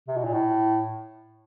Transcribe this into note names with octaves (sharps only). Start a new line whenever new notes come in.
C3
B2
A#2
A2